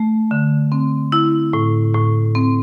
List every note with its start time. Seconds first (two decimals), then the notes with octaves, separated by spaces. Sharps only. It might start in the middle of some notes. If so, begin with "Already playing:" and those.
Already playing: A3
0.31 D3
0.72 C4
1.12 E4
1.53 A2
1.94 A2
2.35 C4